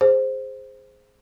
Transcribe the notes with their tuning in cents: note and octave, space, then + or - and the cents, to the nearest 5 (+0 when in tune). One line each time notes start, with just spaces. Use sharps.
G#4 +0 C5 +0